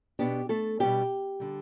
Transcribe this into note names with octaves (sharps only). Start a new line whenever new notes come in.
B2 B3 D4 G4
A3 A4
B2 G3 B3 D4 G4
D3 G3